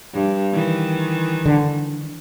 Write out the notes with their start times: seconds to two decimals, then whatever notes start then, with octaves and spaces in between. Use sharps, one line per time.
0.13 G2
0.52 D#3 E3
1.46 D3